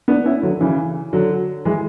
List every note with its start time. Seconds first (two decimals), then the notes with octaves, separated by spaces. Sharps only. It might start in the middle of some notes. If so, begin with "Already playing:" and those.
0.08 B3 D4
0.25 C#4 E4
0.43 D3 F#3
0.60 C#3 E3
1.13 D3 F#3
1.65 E3 G#3